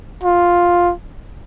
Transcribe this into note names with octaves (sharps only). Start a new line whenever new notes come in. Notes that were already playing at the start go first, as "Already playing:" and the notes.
F4